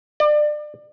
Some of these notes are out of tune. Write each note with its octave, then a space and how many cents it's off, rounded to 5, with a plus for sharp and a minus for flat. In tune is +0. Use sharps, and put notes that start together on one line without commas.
D5 +30